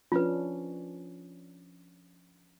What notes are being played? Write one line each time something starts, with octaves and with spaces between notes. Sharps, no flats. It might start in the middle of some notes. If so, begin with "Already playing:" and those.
F3 C#4 D4 F4 B4